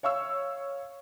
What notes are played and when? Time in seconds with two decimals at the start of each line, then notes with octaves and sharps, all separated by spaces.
0.03 C#5 F5 C#6 E6